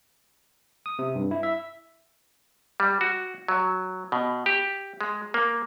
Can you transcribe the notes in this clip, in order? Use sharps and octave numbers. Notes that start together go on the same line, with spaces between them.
D#6
C3
G2
E4
E5
G3
F#4
F#3
B2
G4
G#3
A#3